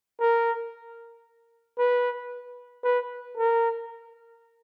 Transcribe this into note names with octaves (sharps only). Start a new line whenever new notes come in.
A#4
B4
B4
A#4